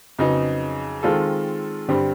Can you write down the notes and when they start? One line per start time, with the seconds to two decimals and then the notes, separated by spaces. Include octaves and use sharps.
0.19 F2 C#3 F#3 B3 D#4
1.03 D#3 G#3 C4 F4 A4
1.88 G2 D3 G3 C4